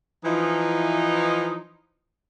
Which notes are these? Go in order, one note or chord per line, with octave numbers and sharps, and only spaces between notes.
E3 F3 D#4